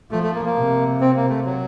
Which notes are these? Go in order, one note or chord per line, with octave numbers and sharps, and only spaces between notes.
F3 A3
A3
A#3
A#3
C3
C4
A#3
A3
F#3